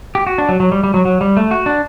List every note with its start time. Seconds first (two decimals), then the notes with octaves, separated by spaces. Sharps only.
0.15 G4
0.27 F#4
0.38 D4
0.49 F#3
0.60 F#3
0.72 G3
0.84 G3
0.94 F#3
1.05 F#3
1.21 G3
1.37 A3
1.51 F#4
1.66 D4